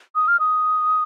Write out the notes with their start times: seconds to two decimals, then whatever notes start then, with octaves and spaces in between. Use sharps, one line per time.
0.15 D#6
0.28 F6
0.40 D#6